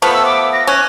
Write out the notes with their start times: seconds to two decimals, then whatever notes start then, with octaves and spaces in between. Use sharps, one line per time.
0.02 F3 A3 B3 B5
0.14 E6
0.25 D6
0.53 A#6
0.67 C#4 F#6